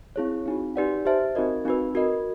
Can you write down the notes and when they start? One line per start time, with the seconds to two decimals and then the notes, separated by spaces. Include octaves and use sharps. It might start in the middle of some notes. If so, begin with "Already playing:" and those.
0.16 C4 E4 G#4 C#5
0.46 C4 D#4 F#4
0.76 D#4 G4 B4 D5 F#5
1.06 G4 C5 E5 A5
1.35 C4 D#4 F#4 A#4 D#5
1.65 C4 D#4 F#4 B4
1.95 F#4 A#4 D#5